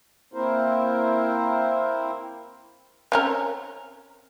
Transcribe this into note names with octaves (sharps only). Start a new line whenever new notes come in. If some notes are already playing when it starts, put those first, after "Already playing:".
A#3 C4 E4 A#4 C5
C4 C#4 A#4